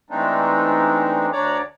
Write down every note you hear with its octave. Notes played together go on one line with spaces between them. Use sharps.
E3 G#3 A3 C4 D4 D#4
D2 D4 C#5 D5 A#5 D6